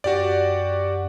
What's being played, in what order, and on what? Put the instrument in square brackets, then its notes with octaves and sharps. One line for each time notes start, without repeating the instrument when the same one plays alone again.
[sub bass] F#2 [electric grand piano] F#4 G4 D5